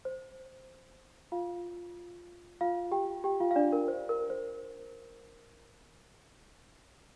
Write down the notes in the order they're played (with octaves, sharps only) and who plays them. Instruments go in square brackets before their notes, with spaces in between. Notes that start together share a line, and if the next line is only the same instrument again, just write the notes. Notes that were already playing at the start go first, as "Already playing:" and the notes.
[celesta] C5
F4 F5
F4 F5
G4 G5
G4 G5
F4 F5
F5
D4 D5
A#4
C5
A#4
C5